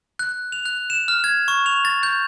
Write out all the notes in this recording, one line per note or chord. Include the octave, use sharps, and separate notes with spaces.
F#6
F7
F#6
E7
F6
G#6
C#6
F7
A6
G6